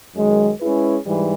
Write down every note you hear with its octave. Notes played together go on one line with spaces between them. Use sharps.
F#2 D#3 G#3
G#3 C#4 E4 G#4 B4
G#2 E3 G3